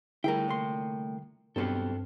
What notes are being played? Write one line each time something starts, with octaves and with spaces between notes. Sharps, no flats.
D3 G3 A3 E4 G#4 A#4 G5
C2 A#3 C6
B1 G2 B2 C4 G4 A4 C5